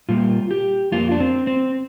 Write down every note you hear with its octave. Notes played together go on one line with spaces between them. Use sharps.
A#2 G3 A#3 F4
G4
F2 F3 A#3 F4
D4
C4
C4